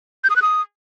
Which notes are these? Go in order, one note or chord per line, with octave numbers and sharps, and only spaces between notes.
G6
D#6
F#6
D#6